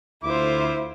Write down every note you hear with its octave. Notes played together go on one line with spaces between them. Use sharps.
D2 E4 F4 C5 D6